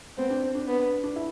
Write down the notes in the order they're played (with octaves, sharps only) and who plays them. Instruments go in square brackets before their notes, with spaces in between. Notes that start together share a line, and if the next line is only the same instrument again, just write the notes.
[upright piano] B3 [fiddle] C4
[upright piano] D4
C4
D4
[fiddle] B3
[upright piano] D4
E4